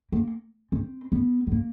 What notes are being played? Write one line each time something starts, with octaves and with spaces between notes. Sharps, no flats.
A#3
C4
B3
B3
A#3